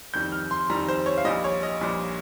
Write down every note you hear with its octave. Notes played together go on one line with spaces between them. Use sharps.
F2 D#3 G3 G6
F6
C6
F2 D#3 G3 A#5
C5
C#5
F5
A#1 A#2 G3 D#5
C#5
D#5
A#1 A#2 G3